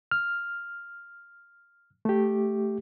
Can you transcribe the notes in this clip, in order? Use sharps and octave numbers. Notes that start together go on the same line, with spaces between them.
F6
A3 G4